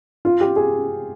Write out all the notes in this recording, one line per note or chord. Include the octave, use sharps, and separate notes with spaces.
F4
G4
G#4